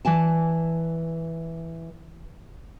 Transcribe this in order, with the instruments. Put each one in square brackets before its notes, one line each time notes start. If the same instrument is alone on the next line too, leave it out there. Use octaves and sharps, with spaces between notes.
[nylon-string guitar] E3 D5 G#5 A5